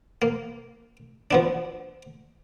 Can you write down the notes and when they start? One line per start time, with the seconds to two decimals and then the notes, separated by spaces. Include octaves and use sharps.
0.22 A#3
1.31 F3 B3 D4